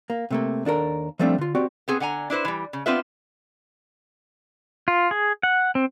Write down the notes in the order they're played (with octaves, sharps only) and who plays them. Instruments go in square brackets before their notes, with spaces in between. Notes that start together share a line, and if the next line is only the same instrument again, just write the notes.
[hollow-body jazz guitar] A#3
C3 A3 A#3
D#2 D4 A4 A#4
F3 G3 A3 C4 D4 E5
D3 F4
C4 F#4 G4 D5
[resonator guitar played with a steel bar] B3 C4 G#4
D3 F#5 G#5 A#5
D4 E4 B4 C5
E3 G3
C#3
B3 C4 D4 F4 B4 E5
[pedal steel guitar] F4
G#4
F#5
C4